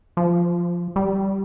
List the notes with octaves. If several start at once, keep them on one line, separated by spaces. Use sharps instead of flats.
F3
G3